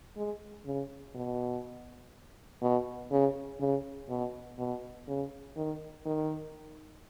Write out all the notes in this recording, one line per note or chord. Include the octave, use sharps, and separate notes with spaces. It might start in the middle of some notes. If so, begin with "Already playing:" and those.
G#3
C#3
B2
B2
C#3
C#3
B2
B2
C#3
D#3
D#3